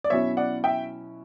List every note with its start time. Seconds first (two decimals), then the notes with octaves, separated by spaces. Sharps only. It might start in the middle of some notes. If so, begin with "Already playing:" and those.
0.04 D5
0.10 B2 F#3 C#4 E4 C#5 E5
0.37 D5 F#5
0.64 E5 G5